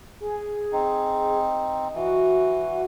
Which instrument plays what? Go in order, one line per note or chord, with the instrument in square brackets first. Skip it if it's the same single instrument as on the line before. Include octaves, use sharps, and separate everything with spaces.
[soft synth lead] G#4
[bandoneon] C4 D#4
[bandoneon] E3 [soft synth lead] F#4